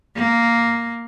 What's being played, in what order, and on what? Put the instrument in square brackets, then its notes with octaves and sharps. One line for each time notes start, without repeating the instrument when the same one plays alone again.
[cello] A#3